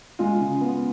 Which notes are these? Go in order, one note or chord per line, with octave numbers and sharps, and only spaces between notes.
G#3 F4
C#3
B3